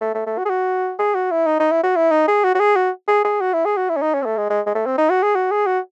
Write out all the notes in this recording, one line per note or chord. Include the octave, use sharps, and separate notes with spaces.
A3
A3
A3
F#4
G#4
F#4
G#4
F#4
E4
D#4
D#4
E4
F#4
E4
D#4
G#4
F#4
F#4
G#4
F#4
G#4
G#4
F#4
E4
G#4
F#4
E4
C#4
D#4
C#4
C4
A3
G#3
G#3
G#3
A3
C4
D#4
F#4
G#4
F#4
G#4
F#4